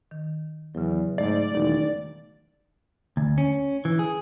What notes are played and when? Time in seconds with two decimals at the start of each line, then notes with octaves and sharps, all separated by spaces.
0.11 D#3
0.75 E2 C#3 F#3
1.18 G#2 A3 D5
1.52 E1 D#3 D#4
3.17 D2
3.38 C#4
3.85 E3
3.99 G#4